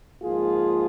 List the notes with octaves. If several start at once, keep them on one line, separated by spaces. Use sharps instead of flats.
G#2 F3 A#3 F4 G#4